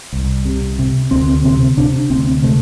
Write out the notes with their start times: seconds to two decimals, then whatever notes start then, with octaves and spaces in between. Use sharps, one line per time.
0.13 C2
0.45 C3
0.79 C3
1.11 D2 C4
1.44 C3 C4
1.77 C3 D4
2.10 D2 C4
2.43 C3 A3